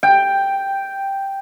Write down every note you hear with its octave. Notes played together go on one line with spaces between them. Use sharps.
G5